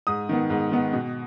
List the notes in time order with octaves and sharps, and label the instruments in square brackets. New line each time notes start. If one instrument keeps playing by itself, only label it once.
[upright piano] G#2 D#6
D#3 B3
G#2
D#3 B3
B2